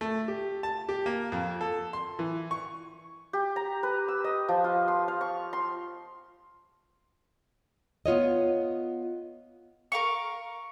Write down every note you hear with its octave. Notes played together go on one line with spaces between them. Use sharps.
A3
G4
A5
G4
A#3
F2
A4
C6
E3
C#6
G4
A#5
B4
E6
D#5
F3
F4
C6
F5
C#6
C6
B3 F4 C#5 D#5
A#4 F5 C#6